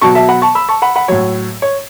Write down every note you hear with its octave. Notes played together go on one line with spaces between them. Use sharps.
B2 F#3 A5 C#6
E5 A5
F#5 B5
A5 C#6
B5 E6
A5 C#6
F#5 B5
F#5 B5
A2 F#3 C#5
C#5